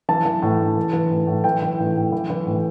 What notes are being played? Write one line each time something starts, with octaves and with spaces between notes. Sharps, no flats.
E3 A5
E3
A2
A2
E3
E3
A2
A2
E3 G5
E3
A2
A2
E3
E3
A2